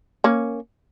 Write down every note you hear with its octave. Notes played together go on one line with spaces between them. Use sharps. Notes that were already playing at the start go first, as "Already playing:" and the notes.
A#3 C#4